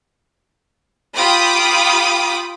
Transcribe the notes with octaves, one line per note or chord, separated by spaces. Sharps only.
F4 G4 G5 B5 D6 D#6